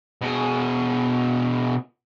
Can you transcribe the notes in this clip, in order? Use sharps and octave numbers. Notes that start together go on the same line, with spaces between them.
B2 G#4